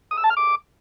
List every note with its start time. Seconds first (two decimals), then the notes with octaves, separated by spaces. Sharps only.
0.11 D#6
0.17 E6
0.24 A5
0.30 F6
0.37 D6